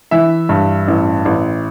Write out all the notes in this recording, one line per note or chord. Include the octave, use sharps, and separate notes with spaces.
E3 E5
G2
A1
A1